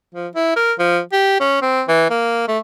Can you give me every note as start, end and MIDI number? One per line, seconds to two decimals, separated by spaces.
0.15 0.27 53
0.35 0.54 64
0.56 0.73 70
0.79 1.00 53
1.12 1.40 67
1.40 1.58 61
1.62 1.83 60
1.88 2.08 52
2.10 2.47 58
2.48 2.58 57